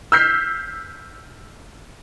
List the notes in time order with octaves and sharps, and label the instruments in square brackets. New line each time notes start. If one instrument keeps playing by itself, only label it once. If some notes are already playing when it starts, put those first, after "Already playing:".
[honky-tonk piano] E6 F6 G6 B6 C7